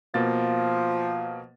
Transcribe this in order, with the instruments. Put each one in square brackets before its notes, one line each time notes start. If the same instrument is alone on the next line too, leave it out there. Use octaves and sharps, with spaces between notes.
[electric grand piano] B2 A#3 A6 [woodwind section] F3